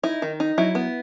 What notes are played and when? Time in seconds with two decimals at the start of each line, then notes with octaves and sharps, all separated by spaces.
0.03 D#4 E4
0.22 D#3
0.40 D#4
0.58 F#3 E4
0.75 B3